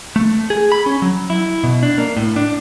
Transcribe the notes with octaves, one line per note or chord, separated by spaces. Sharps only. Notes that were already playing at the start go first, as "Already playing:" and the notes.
A3
G#4
B5
C#4
F#3
E4
B2
D4
A#3
A2
D4